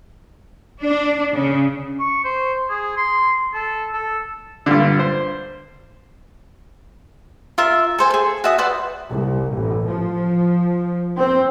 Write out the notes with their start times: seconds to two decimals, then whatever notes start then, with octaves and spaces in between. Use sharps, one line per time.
0.83 D4
1.34 C#3
1.99 C#6
2.24 C5
2.69 G#4
2.97 C6
3.54 A4
3.93 A4
4.66 G2 A#2 D3
4.99 C5
7.58 F4 A#4 E5
7.98 A4 C5 G#5
8.11 G#4 A4
8.44 F#4 E5 D#6
8.58 B4 C5 D5 F#5
9.09 C2
9.53 A1
9.87 F3
11.17 C4